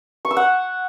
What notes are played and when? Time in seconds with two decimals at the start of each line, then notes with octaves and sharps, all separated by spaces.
0.25 C#6
0.31 E6
0.37 F#5